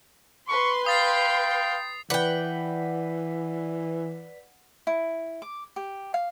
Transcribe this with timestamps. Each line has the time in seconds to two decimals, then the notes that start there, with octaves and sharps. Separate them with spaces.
0.49 B4 C6 C#6
0.86 F5 G5 D#6 A6 C7
2.10 E3 B4 D5 F#5 G5 B6
4.87 E4
5.42 D6
5.76 G4
6.14 F5